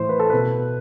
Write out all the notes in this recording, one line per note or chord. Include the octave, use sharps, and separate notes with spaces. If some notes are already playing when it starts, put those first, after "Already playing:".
Already playing: A2 E3 C5
B4
A4
B2 B4